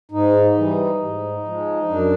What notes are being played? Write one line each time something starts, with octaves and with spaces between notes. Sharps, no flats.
G#2 D#4
E3 G3
G#2
F3 G#3
F#2 D4